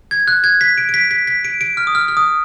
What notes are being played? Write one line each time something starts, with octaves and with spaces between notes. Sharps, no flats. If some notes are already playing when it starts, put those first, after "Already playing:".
G#6
F#6
G#6
B6
D7
D7
B6
B6
B6
D7
D7
F6
D#6
F6
F6
D#6